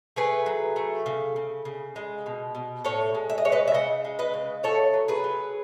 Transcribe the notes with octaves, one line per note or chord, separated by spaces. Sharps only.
A3 G#4 B4
F#3
A3
C#3
C#3
C#3
G#3
B2
B2
A2 A4 C#5
G#3
E5
D#5
G#3 C#5
B4 D#5
E5
C#3 D#5 F#5
G#3
B4 D#5
C#3
A3 A4 C#5
F#3
G#4 B4
F#3